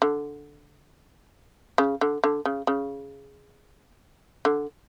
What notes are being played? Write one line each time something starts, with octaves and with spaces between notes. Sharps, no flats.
D3
C#3
D3
D3
C#3
C#3
D3